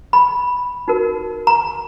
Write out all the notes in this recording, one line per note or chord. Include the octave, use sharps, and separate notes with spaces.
B5
D#4 F#4 A#4
A#5